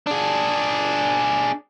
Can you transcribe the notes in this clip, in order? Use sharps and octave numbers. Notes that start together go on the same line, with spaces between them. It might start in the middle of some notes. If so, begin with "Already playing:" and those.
D4 G#4